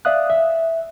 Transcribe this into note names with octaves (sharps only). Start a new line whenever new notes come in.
D5 E5 F5 D#6 F#6
E5